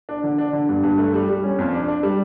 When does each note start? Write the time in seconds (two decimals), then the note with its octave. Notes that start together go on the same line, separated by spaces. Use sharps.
0.09 D4
0.23 D3
0.38 D4
0.53 D3
0.69 G2
0.84 G2
0.98 A3
1.14 G3
1.29 G3
1.44 C#4
1.59 F2
1.73 D4
1.88 D4
2.03 G3